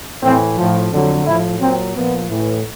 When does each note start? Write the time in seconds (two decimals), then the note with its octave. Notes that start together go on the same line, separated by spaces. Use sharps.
0.23 A2 E3 C4
0.57 A2 F3
0.91 F2 D3 F#3
1.26 A2 F3 E4
1.59 A#2 F#3 C4
1.94 A#2 F3 B3
2.28 A2 E3